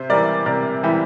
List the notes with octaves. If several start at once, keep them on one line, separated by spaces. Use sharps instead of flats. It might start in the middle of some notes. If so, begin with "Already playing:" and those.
Already playing: C3 C5 E5
E3 G3 A#4 D5
C3 A#4 D5
E3 G3 E4 G4